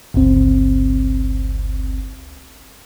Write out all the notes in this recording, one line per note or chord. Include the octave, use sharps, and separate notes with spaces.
G1 C#2 C4